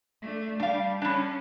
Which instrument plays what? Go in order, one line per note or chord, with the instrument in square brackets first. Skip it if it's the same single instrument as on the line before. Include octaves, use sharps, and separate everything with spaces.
[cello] A3 D4
[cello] G3 [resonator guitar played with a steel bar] D4 F5
[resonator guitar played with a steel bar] G3 D4 [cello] C#4